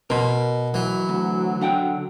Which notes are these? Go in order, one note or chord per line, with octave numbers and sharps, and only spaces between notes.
B2 A#4 C6
E3 F#3
D2
D3 F#5 G5